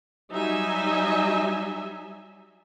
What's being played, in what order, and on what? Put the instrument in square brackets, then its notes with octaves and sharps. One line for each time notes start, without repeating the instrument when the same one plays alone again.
[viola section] F#3 G3 D#4 E5 G#5